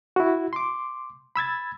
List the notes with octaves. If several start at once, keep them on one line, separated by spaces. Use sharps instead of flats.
E4 F#4
C6 D6
B5 E6 G#6 A6